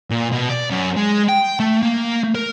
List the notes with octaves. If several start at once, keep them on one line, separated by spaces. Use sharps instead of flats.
A#2
B2
D5
F#2
G#3
G5
A3
A#3
A#4